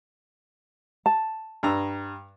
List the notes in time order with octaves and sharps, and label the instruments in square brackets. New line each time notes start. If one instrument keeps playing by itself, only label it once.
[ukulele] A5
[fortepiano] G2 A#5 E6